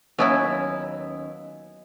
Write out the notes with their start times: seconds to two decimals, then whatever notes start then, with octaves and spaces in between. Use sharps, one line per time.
0.18 D#2 F#3 B3 C#4 E4